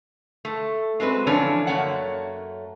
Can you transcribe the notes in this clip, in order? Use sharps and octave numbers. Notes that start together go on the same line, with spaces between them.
A3
F#3 G#3 C4 B4
E3 F3 C#4 D4 A4 C#5
F#2 F3 A3 A#3 C#5 F#5